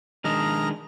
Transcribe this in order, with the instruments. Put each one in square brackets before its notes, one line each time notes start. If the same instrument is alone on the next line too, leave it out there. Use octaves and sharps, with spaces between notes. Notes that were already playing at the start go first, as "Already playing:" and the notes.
[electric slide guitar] D#3 G#3 D4 [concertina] D#5 A#5 F6